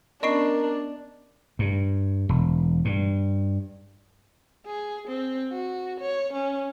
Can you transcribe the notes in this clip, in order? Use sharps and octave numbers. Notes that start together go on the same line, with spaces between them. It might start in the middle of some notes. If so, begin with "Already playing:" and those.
B3 C#4 D4 A#4 D#5 C#6 C7
G2
E1
G2
G#4
C4
F#4
C#5
C#4